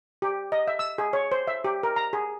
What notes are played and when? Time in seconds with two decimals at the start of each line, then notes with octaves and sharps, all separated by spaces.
0.22 G4
0.52 D#5
0.68 E5
0.79 E6
0.98 G#4
1.13 C#5
1.32 C5
1.47 E5
1.64 G4
1.83 A#4
1.96 A#5
2.13 G#4